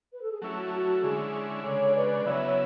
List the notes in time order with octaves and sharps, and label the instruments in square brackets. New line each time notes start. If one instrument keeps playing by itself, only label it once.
[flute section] B4
A4
G#4
[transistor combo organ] F#3 A3 C#4 E4 [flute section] F#4
[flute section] F#4
A4
[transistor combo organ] D3 G#3 C#4 E4 [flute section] G#4
[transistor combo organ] C#3 G#3 D4 [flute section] A4 C#5
[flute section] B4 D5
[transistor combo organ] C#3 F#3 B3 E4 [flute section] C#5 E5